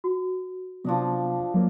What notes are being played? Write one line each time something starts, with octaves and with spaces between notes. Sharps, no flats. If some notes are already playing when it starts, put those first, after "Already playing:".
F#4
C3 F3 F#3 B3 D4 D#5
F#3 A#3 F4